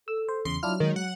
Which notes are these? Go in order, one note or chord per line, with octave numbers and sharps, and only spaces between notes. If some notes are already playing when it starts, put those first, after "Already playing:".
A4 E6
C5
E2 C#3 C6
F#3 D4 E4 F4 F6
D#3 G#3
F#5